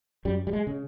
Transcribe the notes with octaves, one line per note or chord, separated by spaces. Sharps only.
F#2 G3
G3
G#3
C#3